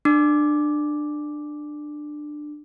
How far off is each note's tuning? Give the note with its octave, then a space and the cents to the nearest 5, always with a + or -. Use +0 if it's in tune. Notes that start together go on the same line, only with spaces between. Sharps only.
D4 +20 D6 +0